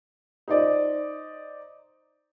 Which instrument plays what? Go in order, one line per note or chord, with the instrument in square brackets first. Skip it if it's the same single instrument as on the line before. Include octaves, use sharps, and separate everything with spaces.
[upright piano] D#4 C5 D5 D#5